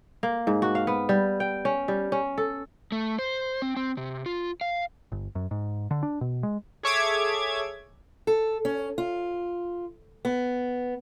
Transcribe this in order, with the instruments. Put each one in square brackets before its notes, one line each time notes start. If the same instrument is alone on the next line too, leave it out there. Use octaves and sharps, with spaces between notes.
[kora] A#3
G#2
F#4
F5
B3
G3
G5
C#4
G3
C#4
A4
[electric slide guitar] A3
C5
C4
C4
C3
F4
F5
[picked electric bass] G1
F#2
G#2
D3
D4
B2
G#3
[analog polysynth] G#4 A4 C#5 E5 D6 G#6
[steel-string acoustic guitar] A4
C#4
F4
B3